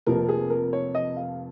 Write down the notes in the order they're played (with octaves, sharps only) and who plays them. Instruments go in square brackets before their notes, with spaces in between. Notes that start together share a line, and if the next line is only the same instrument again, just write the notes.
[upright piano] F1 F2 F3 A#3 A#4
G#4
A#4
C#5
D#5
F5